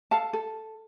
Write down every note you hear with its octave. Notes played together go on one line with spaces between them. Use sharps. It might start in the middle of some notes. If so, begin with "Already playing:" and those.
A4 F5 A5
A4